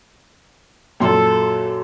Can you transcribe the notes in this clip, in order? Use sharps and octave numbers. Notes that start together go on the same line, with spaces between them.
F#2 A#2 A4 C6